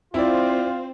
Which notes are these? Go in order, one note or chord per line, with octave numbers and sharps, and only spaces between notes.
C4 E4 F4 C5 D5